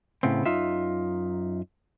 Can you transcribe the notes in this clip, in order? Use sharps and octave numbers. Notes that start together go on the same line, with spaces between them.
A2 C#3 B3 C4
F#2 D#4 F4 E5